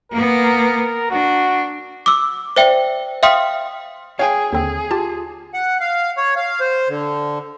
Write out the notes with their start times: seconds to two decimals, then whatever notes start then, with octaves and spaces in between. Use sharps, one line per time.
0.12 A#3 B3 A#4
1.11 D4 F#4
2.06 D6 E6
2.56 C5 D5 E5 G5
3.23 E5 F5 G5 C6 D#6 F6
4.19 G#4 C#5 F5 G5 G#5
4.53 D#2 D3 C4 G#4
4.91 F4 G4 A5
5.54 F#5
5.81 F5
6.17 C#5
6.36 F5
6.60 C5
6.89 D3